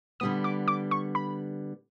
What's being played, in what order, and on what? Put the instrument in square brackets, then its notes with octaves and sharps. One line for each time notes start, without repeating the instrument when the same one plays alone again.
[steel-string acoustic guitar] D3 G3 B3 [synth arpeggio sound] D#6
[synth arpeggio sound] D6
D6
C#6
B5